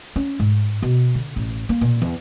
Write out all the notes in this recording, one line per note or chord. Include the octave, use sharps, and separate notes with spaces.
C#4
G#2
B2
D3
A1
A#3
A#2
E2